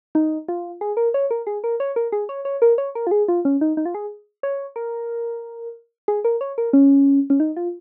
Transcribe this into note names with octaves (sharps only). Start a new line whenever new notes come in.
D#4
F4
G#4
A#4
C#5
A#4
G#4
A#4
C#5
A#4
G#4
C#5
C#5
A#4
C#5
A#4
F4
G#4
F4
C#4
D#4
D#4
F4
G#4
C#5
A#4
G#4
A#4
C#5
A#4
C#4
C#4
D#4
F4